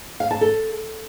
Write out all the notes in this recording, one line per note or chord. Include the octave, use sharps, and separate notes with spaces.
F5
A5
A4